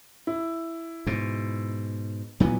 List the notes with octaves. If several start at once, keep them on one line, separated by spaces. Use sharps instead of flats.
E4
G#2 B2
A#2 E3 F#3 B3